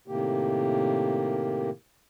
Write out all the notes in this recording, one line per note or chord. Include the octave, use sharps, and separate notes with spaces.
A2 C3 D#3 A#3 G4